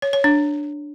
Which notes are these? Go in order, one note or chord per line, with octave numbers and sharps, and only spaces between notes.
C#5
C#5
D4